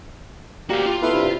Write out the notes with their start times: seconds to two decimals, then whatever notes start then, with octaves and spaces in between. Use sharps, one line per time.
0.70 A#3 F#4 G4 D5
0.86 F4
1.02 B2 E3 A3 B3 E4
1.13 G2 C3